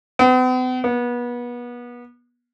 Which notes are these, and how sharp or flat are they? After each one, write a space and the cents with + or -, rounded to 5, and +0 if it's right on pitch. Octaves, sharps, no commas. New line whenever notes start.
B3 +45
B3 -30